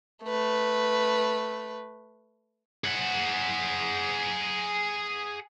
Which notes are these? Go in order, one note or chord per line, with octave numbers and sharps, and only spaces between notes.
A3 B4
G#4 F#5